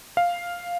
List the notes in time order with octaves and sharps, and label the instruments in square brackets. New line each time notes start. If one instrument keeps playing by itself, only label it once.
[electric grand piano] F5